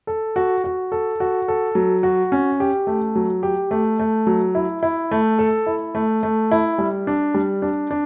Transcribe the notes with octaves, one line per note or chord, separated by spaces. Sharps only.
A4
F#4
F#4
A4
F#4
A4
F#3
F#4
C#4
G4
A3
F#3
G4
A3
A3
F#3
E4
E4
A3
A4
E4
A3
A3
E4
G3
D4
G3
D4
D4